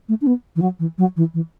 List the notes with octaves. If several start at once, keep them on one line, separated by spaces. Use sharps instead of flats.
A3
D4
B3
E3
F#3
E3
F#3
E3
E3